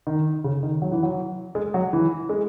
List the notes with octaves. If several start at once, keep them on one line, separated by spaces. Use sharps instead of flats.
D#3
C#3
D#3
F#3
E3
F#3
G#3
F#3
E3
G#3